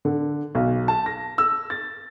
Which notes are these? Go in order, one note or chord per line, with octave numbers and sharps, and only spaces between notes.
D3
B1
A5
A#6
E6
A6